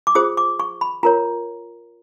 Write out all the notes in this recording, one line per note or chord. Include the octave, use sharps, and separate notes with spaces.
D6
F4 G#4 C5 D#6
D6
C#6
B5
F4 A#4 C#5 A#5